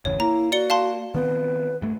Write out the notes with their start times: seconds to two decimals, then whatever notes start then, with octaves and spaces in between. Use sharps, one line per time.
0.05 G1 E2 C#3 C#5
0.20 A#3 E4 A#5
0.52 F#4 D5 C#7 G7
0.70 F5 A5 C6
1.14 D#3 B3 C4 B4
1.82 G2 A3